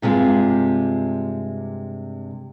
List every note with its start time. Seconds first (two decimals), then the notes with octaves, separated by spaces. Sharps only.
0.02 G2 C3 G#3 F4